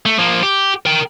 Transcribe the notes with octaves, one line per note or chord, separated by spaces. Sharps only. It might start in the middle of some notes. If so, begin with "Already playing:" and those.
A3
F3 A#3
G4
A#4 G5